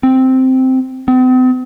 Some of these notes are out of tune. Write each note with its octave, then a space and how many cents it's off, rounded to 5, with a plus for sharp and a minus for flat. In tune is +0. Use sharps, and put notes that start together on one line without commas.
C4 -5
C4 -45